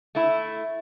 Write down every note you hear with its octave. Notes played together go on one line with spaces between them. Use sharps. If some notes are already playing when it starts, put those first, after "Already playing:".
A3 E4